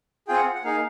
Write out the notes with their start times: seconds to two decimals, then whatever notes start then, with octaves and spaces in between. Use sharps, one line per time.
0.28 C4 F4 G#4 G5
0.37 F#5
0.55 F#5
0.64 A#3 D#4 G#4 F5